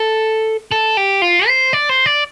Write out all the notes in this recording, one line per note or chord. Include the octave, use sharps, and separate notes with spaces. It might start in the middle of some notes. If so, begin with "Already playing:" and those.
Already playing: A4
A4
G4
F4
C5
D5
C5
D5